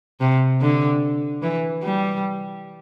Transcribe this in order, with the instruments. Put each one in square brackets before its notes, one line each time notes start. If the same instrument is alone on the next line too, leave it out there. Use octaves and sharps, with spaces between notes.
[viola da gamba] C3
D3
E3
G3